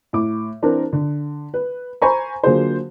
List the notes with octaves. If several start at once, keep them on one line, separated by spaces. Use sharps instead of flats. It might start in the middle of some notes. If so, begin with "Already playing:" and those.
A2 D6
E3 C4 D4 A#4
D3
B4
C5 G#5 A#5 B5 C#6
D3 F#3 A#3 F4 G#4 C5